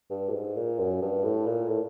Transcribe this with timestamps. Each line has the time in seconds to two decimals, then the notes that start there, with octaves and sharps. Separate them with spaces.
0.10 G2
0.29 A2
0.34 G#2
0.57 A#2
0.79 F#2
1.02 G2
1.24 A2
1.46 A#2
1.69 A2